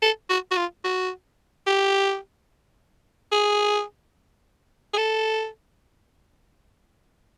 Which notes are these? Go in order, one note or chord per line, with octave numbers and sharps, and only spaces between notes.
A4
F#4
F#4
F4
F#4
G4
G#4
G#4
A4